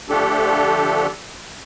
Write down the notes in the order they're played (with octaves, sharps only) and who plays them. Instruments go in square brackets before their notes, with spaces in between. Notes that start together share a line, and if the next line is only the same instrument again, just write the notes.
[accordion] D3 F3 A3 D4 G4 A4